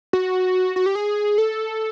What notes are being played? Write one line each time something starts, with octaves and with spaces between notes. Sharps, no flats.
F#4
F#4
G4
G#4
A4